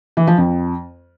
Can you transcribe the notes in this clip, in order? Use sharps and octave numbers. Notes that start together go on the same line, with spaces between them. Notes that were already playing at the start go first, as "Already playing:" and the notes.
E3
F3
F2